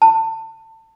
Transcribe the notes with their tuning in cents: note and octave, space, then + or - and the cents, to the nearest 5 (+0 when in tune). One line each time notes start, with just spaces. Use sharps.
A5 +25